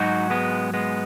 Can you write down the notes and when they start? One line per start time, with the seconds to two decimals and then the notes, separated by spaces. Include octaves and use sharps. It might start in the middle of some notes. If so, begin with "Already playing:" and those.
Already playing: G#2 F#3 D#4 F#4
0.30 G#3 B3
0.74 G#3 B3